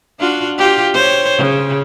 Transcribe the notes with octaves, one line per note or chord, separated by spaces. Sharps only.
D4 F4 F#4
F4 G4
C5 C#5
C#3